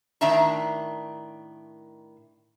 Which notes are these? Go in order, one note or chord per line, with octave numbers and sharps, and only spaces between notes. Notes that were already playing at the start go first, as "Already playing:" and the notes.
A2 D#3 D4 E5 A5 A#5